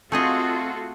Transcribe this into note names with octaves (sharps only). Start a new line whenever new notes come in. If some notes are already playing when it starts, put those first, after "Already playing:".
A3 C4 F4 F#4 G#4 A4 D#5